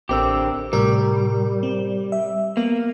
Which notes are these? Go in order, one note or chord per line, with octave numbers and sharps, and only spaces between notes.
A1 D3 C4 G4 A#4 E6
A2 C3 G3 A#4
C4
E5
A#3 B3